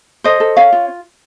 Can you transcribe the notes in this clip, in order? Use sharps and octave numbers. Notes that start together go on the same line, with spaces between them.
A4 C5 D#5
A4
C#4 C#5 F5
F4